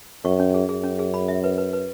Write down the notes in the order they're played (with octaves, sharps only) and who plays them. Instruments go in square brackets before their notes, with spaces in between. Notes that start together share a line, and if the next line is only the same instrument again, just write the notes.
[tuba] F#2 [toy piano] C#6
[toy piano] C#4
G#4
[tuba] F#2 [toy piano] G#4
[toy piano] C#4
G#4
B5
E5
B4
B4
B4